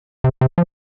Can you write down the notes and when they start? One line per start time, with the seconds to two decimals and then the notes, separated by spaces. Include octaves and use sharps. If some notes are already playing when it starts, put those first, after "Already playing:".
0.24 C3
0.41 C3
0.58 F3